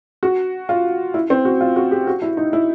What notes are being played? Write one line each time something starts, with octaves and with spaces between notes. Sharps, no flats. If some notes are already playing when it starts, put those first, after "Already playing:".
F#4
F4
E4
C4
F#4
F4
F#4
G4
F#4
E4
D#4
E4